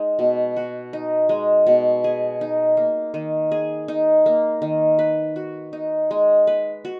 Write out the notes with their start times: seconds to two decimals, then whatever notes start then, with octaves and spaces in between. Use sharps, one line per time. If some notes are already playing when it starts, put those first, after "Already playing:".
Already playing: G#3 D#4
0.19 B2
0.56 F#4
0.93 D#4
1.29 G#3
1.67 B2
2.04 G#4
2.41 D#4
2.77 A#3
3.14 D#3
3.52 G#4
3.88 D#4
4.26 A#3
4.62 D#3
4.99 B4
5.36 F#4
5.73 D#4
6.11 G#3
6.47 B4
6.85 F#4